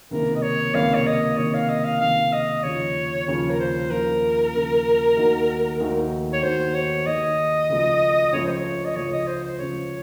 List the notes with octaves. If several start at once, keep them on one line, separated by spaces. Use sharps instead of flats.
C#2 C3 D#3 A#3 A#4
D#5
C#5
C#2 C3 D#3 A#3 F5
C#5
D#5
C#2 C3 D#3 A#3 C#5
F5
D#5
F5
C#2 C3 D#3 A#3 F5
D#5
D#2 C#3 F3 C#5
D#2 C#3 F3 C#5
A#4
C5
D#2 C#3 F3 A#4
D#2 C#3 F3
D#2 D#3 A3 D#4 F#4
D#2 D#3 A3 D#4 F#4
C#5
D#2 D#3 A3 D#4 F#4 C5
C#5
D#2 D#3 A3 D#4 F#4 D#5
C#2 C#3 F3 A3
C#2 C#3 F3 A3 C#5
C5
C#5
D#5
C#2 C#3 F3 A3 C#5
D#5
C5
C5
C#2 C#3 F3 A3 C#5